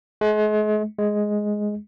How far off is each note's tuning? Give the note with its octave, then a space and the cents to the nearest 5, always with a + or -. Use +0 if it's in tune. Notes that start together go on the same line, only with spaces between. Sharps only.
G#3 +40
G#3 +5